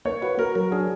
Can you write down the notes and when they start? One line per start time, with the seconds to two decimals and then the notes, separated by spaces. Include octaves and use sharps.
0.05 A#3 C#5
0.22 F#4 B4
0.39 F#4 A#4
0.55 F#3 A#4
0.72 D4 G#4